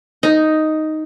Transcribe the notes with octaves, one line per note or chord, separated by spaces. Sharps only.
D#4